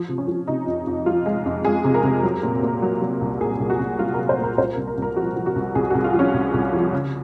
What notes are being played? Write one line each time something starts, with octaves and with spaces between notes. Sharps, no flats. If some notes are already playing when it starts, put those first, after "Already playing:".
Already playing: F3
C3
C#4
F3
C3 D#4
F2
F2
F3 F4
G#3
F2
G#3 G#4
C3
A#4
C3
F#3
A#2
A#2
F#3
F#3
C2
A#2 G#4
C2
F#4
C2
F#3 F4
A#4
F#3
C5
A#2 A#4
C2 C5
A#4
C2
A#4
C2 A#4
F3 F#4
F3
F#4
C2
C2 G#4
F#4
C2
F4
F3
C#4
C2
C2
F3
C#3